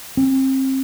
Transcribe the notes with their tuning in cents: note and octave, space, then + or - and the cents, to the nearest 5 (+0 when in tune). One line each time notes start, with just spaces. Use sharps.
C4 +30